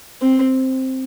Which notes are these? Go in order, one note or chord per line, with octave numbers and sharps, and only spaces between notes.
C4